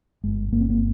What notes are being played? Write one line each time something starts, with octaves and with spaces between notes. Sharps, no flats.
G1 G#3
G1 A#3
C4
A#3